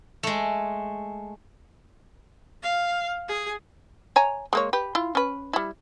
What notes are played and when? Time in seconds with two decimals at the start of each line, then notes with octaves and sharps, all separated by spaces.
0.23 G#3 A3
2.63 F5
3.28 G#4
4.16 C#5 G#5 A#5
4.53 G#3 A#3 C#5
4.73 G4 B4
4.95 E4 F4
5.15 C#4 B4
5.53 G3 E4